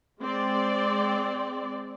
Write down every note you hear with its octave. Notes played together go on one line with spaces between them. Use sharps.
G#3 C4 D5